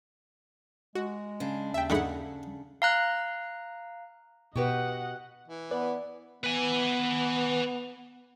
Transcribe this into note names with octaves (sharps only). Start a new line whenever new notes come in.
G#3 F#4
C#3 D4
D#2 E5 G5
D3 A3 D#4 G#4 F#5 B5
F5 A#5 F#6
B2 F#4 G4 B4 D#5 F#5
E3
B3 B4 D5
B3 B4 G#5